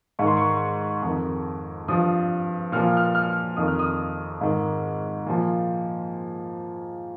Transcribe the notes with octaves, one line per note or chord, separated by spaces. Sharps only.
G#2 D#3 C#6
C6
C#6
F2 D#3
G2 F3 D#6
A#2 F3 F6
F6
F6
F2 D#3 D#6
F6
D#6
G#2 D#3
A#2 F3